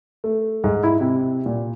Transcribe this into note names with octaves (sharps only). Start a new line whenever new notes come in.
A3
G#2
E4
C3
A#2